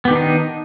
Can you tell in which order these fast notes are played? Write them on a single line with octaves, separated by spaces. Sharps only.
B3 G4 D#3 D4 D#4